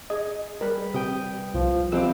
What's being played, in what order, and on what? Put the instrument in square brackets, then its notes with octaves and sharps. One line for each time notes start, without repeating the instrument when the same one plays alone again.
[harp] G#4 [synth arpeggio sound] D#5
[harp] G3 B4 [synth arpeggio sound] A#4
[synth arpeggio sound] C3 [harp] G5 D#6
[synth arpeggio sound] C2 [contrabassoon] F3
[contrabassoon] F2 [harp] E3 C4 G4 [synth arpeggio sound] E6